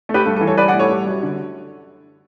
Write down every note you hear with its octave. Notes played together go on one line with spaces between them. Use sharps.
A3
G4 B4
G2 A4
A4
E3
A4 C#5
G3 B4 D5
D5 F#5
A2
A4 C#5
G3
F#2
D3